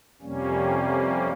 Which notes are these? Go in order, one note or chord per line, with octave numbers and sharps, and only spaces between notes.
F2 C3 G3 A#3 C#4